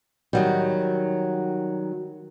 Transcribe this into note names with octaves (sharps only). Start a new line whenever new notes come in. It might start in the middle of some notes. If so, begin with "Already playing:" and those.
D#3 F#3 G3